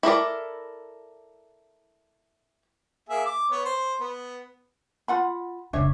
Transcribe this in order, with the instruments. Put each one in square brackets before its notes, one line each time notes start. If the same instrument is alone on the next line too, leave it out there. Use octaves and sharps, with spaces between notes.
[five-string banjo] E4 A4 A#4 D5
[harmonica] A#3 G#4 E5
D6
B3 C#5
C5
B3
[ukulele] F4 F#5 B5
[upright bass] F1 C#3 [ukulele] D4 C#5 E5